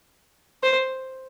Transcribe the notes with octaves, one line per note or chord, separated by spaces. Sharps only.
C5